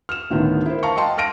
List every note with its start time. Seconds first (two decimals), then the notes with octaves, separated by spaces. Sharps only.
0.09 F6 E7
0.30 D2 A2 D3 D#3 B3
0.66 E4 A#4 C5
0.83 F5 A5 A#5 C#6 C#7
0.96 D#5 F#5 G5 A5 C6
1.17 F5 A5 F6 A#6 D7 D#7